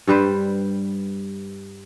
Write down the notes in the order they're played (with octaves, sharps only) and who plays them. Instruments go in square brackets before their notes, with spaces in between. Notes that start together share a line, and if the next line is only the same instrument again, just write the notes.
[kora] G2 G3 B4 C5